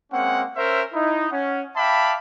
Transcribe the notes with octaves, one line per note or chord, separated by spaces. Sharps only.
G#3 A#3 C4 C#4 F#5
C#4 A#4 C5 E5
D#4 E4
C#4 F#5
E5 F5 G5 A5 B5 D6